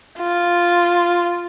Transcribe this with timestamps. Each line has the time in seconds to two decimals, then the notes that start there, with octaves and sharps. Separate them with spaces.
0.19 F4